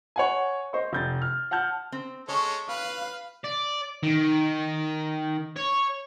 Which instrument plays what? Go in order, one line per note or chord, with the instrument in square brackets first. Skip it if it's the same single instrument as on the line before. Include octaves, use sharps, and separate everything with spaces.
[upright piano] C#5 F#5 G#5
C5 D#5 C#6
F1 G6 A6
F6
F#5 A5 F6 G6
[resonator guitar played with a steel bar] C4
[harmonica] G#3 C#4 A4 [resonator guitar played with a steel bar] C#5
[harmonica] B4 [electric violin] F5
[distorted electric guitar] D5
D#3
C#5